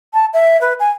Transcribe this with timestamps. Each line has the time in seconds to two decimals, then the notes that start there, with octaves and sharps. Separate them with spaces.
0.14 A5
0.34 E5
0.61 B4
0.80 G#5